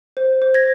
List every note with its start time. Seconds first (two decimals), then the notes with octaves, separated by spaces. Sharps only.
0.17 C5
0.42 C5
0.54 G#6 A#6